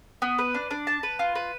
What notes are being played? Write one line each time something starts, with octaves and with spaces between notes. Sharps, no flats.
B3
B4
D4
D4
A5
B4
F4
B4